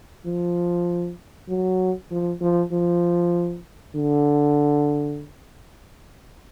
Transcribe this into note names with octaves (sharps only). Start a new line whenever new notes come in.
F3
F#3
F3
F3
F3
D3